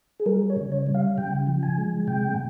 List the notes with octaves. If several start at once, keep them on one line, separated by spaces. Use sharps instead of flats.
G#4
G3 A#4
C#5
C#3
C#5
G3
F5
C#3 G5
F3
G#5
G#3
C3 G5